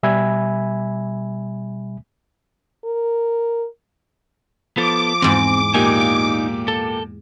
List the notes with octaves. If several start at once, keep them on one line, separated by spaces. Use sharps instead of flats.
B2 G3 E5 G#5 B5 G#6
A#4
F3 B3 A4 D6
E2 G#2 C4
A#2 A#3 D#4 G4 G#5
A4